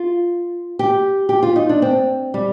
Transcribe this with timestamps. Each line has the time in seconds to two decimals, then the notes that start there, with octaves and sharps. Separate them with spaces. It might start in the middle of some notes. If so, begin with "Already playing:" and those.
Already playing: F4
0.79 G4
1.29 G4
1.43 F4
1.56 D#4
1.69 D4
1.82 C4
2.34 G3